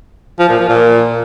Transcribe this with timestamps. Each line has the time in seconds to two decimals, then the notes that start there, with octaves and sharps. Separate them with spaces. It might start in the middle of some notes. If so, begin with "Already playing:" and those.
0.39 F3
0.49 A#2
0.59 F3
0.69 A#2